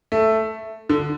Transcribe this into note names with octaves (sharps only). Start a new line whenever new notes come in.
A3
D3